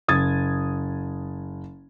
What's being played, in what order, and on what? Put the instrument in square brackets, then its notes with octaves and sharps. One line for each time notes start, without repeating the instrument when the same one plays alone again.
[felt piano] F#1 D#6 G#6 A6